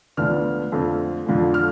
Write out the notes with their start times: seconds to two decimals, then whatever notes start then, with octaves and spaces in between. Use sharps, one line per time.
0.17 D2 D3 F3 B3 D4 F6
0.72 F2 D3 A3 C4
1.26 F2 D3 F3
1.54 F6